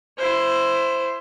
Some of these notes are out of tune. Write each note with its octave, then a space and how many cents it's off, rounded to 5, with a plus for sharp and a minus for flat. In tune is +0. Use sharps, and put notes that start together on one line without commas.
E4 +20 C5 +0